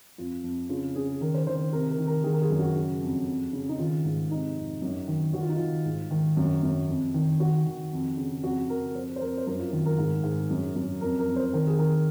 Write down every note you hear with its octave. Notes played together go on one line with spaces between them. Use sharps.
F2 F4
F2
C#3 F4
C#3 G#4
D#3 A#4
C5
D#3 C5
C3 A#4
A#4
D#3
A#4
D#3 G#4
A#4
G#4
F#2
F#4
C#3
F2
F2
C#3
D#4
D#3 F4
G#2
C3 D#4
F2
F#2
D#3
D#3 F#4
F4
D#4
D#3 F4
G#2
D#3
F#2
F#2
F2
D#3
D#3 F#4
D#3
F2
C#3
F2 F#4
C#3 A#4
F2 C5
C5
F2 A#4
C5
F#2 A#4
F4
D#3 F4
A#4
G#2
G#2
F#2
F#2
F2 A#4
A#4
F2
C5
D#3 A#4
G#4
D#3 A#4